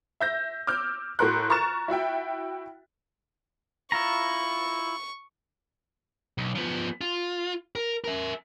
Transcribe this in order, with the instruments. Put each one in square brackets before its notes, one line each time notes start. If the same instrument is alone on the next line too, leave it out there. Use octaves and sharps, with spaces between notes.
[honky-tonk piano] E5 G6 A#6
D6 E6 F6 G6
A2 F#4 A4 A#4 C6 F#6
A#5 C#6 F6 A6 E7
E4 F#4 E5 G5
[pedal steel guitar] E4 F4 A#5 [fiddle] C#6
[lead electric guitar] B1
F3 B3
F4
A#4
A#4 E5